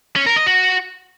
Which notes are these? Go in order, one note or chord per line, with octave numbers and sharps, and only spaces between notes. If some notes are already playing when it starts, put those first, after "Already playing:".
C#4
A#4
D#5
F#4